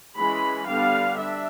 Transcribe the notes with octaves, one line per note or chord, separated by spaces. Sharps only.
E3 G#3 C#4 B5
D3 G3 B3 D4 F5
D4 E5